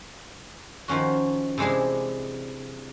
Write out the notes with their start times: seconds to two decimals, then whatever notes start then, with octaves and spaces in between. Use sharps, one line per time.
0.88 D#3 F3 C#4 F#4
1.58 C3 E3 G#3 D4 G#4